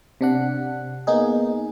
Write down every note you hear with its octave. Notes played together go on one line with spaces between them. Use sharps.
C3 D4 F#5
A#3 B3 D#4 G#4